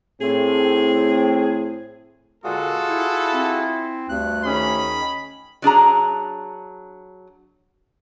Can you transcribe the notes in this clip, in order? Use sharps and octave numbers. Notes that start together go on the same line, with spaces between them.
A2 C4 G#4
A#2 D3 G#3 F4 F#4 G#4 A4
E4
C4
D2 G2 F#6
D#3 C#4 G#4 B5
F#3 D4 G#4 A#5